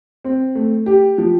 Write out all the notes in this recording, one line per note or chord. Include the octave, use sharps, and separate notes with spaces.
C4
A3
G4
F3